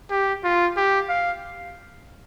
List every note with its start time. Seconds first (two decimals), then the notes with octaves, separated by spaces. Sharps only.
0.11 G4
0.44 F4
0.77 G4
1.09 F5